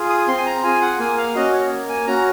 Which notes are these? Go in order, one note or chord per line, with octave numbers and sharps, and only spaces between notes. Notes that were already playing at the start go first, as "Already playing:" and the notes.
Already playing: F4 G#4
D#6
C4 C6
G#5
A#5
F4 G#4 G#5
F#5
A#3 G#5
F5
C#4 F#4 D#5
C#5
A#3
G#5
C#4 F#4 A#5